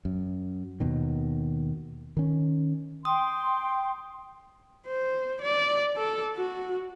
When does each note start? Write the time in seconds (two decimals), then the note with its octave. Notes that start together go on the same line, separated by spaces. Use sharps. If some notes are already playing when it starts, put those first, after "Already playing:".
0.05 F#2
0.80 D#2 B2 D#3
2.17 D#3 C#4
3.05 G5 C6 D#6
4.87 C5
5.41 D5
5.96 A4
6.36 F#4